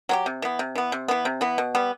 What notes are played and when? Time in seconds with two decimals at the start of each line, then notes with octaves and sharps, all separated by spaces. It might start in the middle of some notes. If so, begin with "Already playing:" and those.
0.09 F#3 C4 G4
0.26 C3
0.42 E3 B3
0.59 C3
0.75 E3 B3
0.92 C3
1.08 E3 B3
1.25 C3
1.41 E3 B3
1.58 B2
1.75 G3 B3